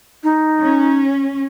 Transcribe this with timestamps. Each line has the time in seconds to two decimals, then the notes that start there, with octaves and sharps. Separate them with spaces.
0.24 D#4
0.60 C#4